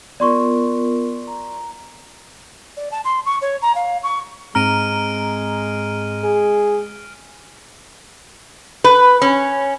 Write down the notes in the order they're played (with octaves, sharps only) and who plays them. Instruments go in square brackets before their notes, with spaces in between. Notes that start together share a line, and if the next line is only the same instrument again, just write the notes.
[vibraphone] B3 F4 A#4 [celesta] D5 C6 C#6
[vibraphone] A#5
[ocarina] D5
A5
C6
C#6
C#5
A#5
F5
C#6
[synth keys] G#2 C4 A#5 [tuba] G#3 [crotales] F6 D7 D#7
[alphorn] G#4
[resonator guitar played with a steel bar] B4
C#4